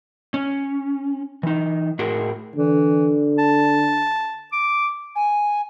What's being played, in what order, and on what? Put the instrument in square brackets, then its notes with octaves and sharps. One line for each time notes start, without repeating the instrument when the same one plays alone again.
[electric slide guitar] C#4
E3 D#4
A2 F#4 G#4 A#4
[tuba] D3 [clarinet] E3
[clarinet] A5
D6
[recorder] G#5